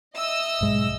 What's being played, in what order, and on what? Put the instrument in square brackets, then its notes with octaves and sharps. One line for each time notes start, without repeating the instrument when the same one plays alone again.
[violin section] D#5 E6 [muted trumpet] E5
[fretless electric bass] B1 G#2 G#3